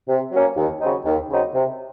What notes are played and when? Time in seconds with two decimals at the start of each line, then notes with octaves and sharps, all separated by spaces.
0.09 C3
0.32 F#3 A#3 C#4
0.56 D#2
0.81 C#3 F#3 C4 D#4
1.05 D#2
1.30 C#3 F#3 C4 D#4
1.54 C3